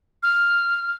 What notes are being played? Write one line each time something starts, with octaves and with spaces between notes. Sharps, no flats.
F6